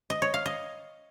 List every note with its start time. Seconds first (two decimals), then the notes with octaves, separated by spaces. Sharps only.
0.10 D#5
0.22 C#5
0.34 F5
0.46 D#5